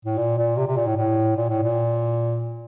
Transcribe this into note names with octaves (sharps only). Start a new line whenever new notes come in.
A2
A#2
A#2
C3
C3
A#2
A2
A2
A#2
A2
A#2